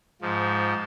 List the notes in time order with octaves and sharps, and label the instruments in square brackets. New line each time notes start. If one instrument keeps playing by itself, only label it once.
[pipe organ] G#2 F3